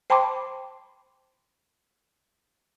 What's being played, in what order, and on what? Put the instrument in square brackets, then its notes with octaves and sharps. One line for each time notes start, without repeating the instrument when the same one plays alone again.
[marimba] C5 G5 A5 B5 C6 D6